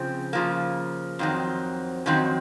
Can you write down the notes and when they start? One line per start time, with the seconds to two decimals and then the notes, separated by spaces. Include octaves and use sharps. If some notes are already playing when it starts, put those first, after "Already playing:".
Already playing: C#3 F3 C4
0.33 C#3 F3 A#3
1.19 F2 D#3 F#3 C4
2.06 F2 D#3 F#3 C4 C#4